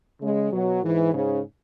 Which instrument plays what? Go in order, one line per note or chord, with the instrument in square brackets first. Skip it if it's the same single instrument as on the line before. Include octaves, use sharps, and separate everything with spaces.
[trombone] C#3 [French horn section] G#3
[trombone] B2 [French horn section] F#3
[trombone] G#2 [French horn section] E3
[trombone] G#2 [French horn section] C#3